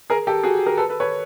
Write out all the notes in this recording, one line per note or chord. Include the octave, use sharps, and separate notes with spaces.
G#4 A#4
G4 A4
F#4 G#4
G#4 A#4
A4 B4
A4 B4
B4 C#5